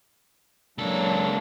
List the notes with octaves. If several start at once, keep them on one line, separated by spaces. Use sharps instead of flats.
C#2 F#3 A#3 D4 A4